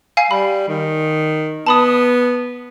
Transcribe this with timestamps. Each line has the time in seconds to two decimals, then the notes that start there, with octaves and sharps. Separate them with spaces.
0.17 F5 G#5 C7
0.31 G3 B5
0.68 D#3
1.66 B3 A5 B5 D#6